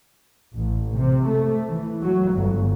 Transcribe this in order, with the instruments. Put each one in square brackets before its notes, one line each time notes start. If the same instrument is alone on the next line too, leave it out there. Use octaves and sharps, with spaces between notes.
[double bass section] A1
C3
A3
E3
F#3
G1